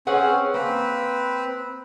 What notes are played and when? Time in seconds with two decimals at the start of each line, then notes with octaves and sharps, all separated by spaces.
0.07 C4 C#4 G#4 B4 F#5
0.54 A#3 C4 B4